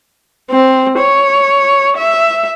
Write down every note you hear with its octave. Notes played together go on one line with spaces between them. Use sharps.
C4
C#5
E5